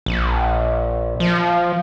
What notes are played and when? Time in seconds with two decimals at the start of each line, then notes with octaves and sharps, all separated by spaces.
0.06 A#1
1.20 F3